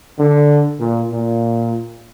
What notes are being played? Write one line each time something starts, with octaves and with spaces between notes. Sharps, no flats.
D3
A#2
A#2